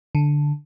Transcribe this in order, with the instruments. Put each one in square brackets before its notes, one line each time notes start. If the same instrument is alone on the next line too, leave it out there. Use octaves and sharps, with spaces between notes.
[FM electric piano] D3